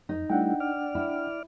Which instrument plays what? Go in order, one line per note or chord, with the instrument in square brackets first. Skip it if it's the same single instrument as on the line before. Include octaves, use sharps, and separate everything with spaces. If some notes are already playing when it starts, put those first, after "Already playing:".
[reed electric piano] F2 [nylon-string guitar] D#4
[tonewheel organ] G3 A3 E4 [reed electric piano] D4 F#5 G5
[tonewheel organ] D5 F6
[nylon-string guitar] E4